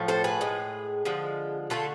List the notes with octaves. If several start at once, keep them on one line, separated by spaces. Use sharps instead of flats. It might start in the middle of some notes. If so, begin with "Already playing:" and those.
Already playing: A2 F3 A3
A4 C5
G#4 B4
A2 G#3
D3 F3 G#3
D3 A3 F4 A4